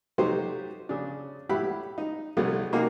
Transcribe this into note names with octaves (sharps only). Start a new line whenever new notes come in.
C3 F#3 A3 D#4 G4 C5
C#3 D4
A2 G4 E5 F#5 B5
D#4
C2 C3 F#3 G#3 A3 B3
C3 A#3 D#4 F#4 G#4